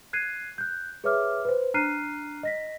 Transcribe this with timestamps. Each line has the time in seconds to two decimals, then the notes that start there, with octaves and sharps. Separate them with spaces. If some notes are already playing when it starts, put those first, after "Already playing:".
0.13 F#6 G#6 C7 D#7
0.58 F#6 G6
1.04 G#4 B4 C#5 E5 D6 F6
1.45 B4 C5
1.74 D4 A#5 F6 F#6 C7 D#7
2.43 D#5 A#6 B6